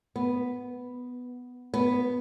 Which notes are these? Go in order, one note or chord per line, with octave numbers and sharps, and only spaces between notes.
B3
B3